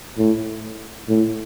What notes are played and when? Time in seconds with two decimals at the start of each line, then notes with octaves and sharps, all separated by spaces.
0.18 A2
1.09 A2